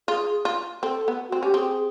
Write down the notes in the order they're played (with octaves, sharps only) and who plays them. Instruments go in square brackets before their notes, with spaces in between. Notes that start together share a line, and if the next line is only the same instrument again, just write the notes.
[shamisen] F4 [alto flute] G#4
[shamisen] F4
[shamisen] C4 [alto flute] A4
[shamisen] B3
[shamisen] C4 [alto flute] F#4
[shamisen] C#4 [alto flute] G4
[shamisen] C4 [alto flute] G#4